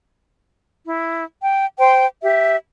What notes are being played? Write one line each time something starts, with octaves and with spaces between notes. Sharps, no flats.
E4
G5
C5 G5 C6
G4 E5